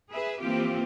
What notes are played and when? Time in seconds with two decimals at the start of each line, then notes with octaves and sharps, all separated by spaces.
0.11 G#4 B4 E5
0.40 E3 F3 A#3 C4 F4 G4